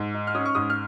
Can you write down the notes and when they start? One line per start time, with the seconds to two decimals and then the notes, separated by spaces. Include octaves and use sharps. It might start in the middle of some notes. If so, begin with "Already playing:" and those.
Already playing: G#2
0.14 D#4
0.27 F6
0.35 C#4 D#6
0.45 C#6
0.55 G#2 D#6
0.70 F6